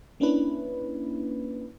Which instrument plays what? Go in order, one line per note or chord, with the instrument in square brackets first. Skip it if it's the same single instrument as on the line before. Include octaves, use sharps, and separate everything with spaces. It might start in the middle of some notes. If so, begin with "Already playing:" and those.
[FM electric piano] A#3 C#4 D4 E4 B4